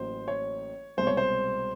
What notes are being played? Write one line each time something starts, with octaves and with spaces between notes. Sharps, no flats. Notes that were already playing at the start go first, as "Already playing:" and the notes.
Already playing: A1 A2 F#3 A#3 C5
C#5
C2 B2 G#3 C5
C#5
C5